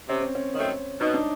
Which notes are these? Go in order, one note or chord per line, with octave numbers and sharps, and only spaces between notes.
C3 C#4
C4
C#4
D#3 F#3 A3 C4 C#4
B2 D#4
D4